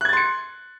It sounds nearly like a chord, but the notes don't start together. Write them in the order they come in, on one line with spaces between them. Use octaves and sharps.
F#6 G#6 A6 C6 C#7